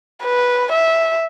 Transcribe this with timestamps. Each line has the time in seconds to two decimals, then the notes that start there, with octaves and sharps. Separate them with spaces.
0.24 B4
0.72 E5